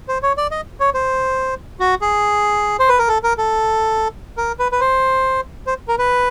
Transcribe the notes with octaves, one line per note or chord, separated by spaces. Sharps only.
C5
C#5
D5
D#5
C#5
C5
F#4
G#4
C5
B4
A#4
A4
A#4
A4
A#4
B4
B4
C5
C5
A#4
B4